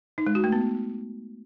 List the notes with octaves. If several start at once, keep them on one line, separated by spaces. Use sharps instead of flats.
D#4
G#3
F#4
A3
B3